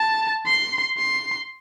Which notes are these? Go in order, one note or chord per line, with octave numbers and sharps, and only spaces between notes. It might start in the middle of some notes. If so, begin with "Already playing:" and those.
Already playing: A5
C6
C6